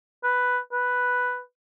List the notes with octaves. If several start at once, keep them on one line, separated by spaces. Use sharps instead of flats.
B4
B4